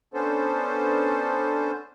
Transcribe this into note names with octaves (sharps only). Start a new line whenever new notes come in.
B3 C#4 D4 A4 C5